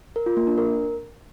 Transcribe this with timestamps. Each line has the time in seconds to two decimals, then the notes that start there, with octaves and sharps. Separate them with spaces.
0.16 A#4
0.26 F4
0.37 A#3
0.47 D4
0.58 A#4